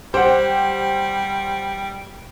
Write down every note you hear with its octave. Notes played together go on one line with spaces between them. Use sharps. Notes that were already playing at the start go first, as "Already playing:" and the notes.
G3 G4 C5 F#5